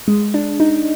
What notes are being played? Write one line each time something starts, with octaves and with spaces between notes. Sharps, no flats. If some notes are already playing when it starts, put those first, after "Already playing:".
G#3
D4
D#4